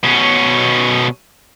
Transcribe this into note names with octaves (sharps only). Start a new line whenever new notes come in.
B2 C#4